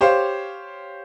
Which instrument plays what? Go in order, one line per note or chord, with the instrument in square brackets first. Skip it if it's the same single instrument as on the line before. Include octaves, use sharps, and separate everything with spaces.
[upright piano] G4 C5 C#5 F5